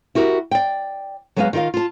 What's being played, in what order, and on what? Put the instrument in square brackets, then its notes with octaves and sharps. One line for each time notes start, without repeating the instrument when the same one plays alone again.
[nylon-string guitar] E4 F#4 G4 A#4
D5 G5
F#3 G#3 B3 B4 D#5 F5
D#3 F4 A#4 D#5 F5
F4 A5